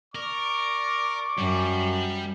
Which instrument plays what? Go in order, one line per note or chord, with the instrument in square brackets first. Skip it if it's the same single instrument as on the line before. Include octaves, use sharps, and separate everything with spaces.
[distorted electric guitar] A#4 [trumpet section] D5 C#6 D6
[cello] F#2 [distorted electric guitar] G3